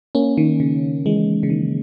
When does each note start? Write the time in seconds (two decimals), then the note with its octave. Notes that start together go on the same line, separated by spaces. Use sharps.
0.15 A#3 C#4
0.37 D#3
0.60 C#3
1.06 E3 G#3
1.43 C#3
1.50 D#3